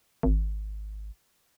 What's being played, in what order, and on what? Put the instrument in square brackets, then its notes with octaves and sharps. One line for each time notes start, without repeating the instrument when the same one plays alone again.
[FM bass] G#1